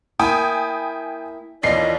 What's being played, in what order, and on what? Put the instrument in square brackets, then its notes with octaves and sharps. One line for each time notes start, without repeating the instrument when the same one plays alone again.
[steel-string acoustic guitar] A#3 E4 [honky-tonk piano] G5 G#5 D#6
[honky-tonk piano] D#2 C7 [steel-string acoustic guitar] E3 C#4 F4 [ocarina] D5 [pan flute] D#5